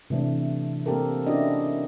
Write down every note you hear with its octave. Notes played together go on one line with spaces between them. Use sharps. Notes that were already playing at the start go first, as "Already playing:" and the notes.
C3 E3 A3 D4
A#3 C4 G4 A4 A#4
C#4 D4 E4 F#4 D5 D#5